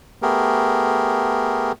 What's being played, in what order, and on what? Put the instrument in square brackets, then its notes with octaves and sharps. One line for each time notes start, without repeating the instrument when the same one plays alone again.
[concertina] A3 B3 G4 G#4 A#4